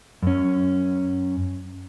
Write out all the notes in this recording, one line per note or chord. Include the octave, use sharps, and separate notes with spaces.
F#2 C#4